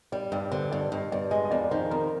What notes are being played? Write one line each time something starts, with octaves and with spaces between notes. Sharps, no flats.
G3 D5
G2 D5
D3 C5
G2 D5
G2 D#5
G2 D5
G#3 D#5
D#5
F2 D5
D#3 C5
F2 A#4